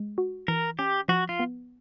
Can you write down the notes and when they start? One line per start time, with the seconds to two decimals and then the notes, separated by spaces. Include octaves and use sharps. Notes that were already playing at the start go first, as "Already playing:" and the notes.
Already playing: G#3
0.18 F#4
0.48 E3 A#4
0.79 C#4 G4
1.08 F3 F#4
1.29 F4
1.40 B3